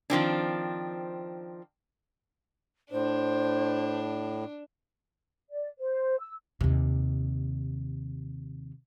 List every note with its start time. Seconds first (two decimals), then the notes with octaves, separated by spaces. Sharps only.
0.10 D#3 F3 C4 D4
2.92 A2 D4 C5
5.50 D5
5.79 C5
6.20 E6
6.61 D#2 C3